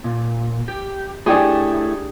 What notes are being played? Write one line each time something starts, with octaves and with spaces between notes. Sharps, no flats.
A#2
G4
A3 D4 E4 G4 G#4